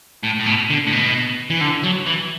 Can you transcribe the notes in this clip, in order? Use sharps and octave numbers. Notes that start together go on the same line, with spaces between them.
A2
A2
B2
D3
A2
B2
E3
D3
F#3
E3